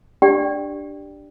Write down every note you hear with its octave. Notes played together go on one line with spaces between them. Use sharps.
D4 G4 D5 G5